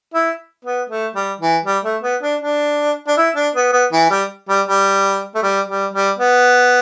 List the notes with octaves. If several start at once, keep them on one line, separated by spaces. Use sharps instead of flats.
E4
B3
A3
G3
E3
G3
A3
B3
D4
D4
D4
E4
D4
B3
B3
E3
G3
G3
G3
A3
G3
G3
G3
B3